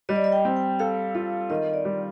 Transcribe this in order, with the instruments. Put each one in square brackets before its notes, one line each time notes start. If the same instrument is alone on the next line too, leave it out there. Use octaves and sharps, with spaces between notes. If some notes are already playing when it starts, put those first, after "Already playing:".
[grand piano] G3 [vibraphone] D#5
[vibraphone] D5
D#5
G5
[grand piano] C4
[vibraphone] G5
[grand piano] A4 [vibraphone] F5
[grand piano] F4
[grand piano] D#3 [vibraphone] D#5
[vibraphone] D5
[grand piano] G3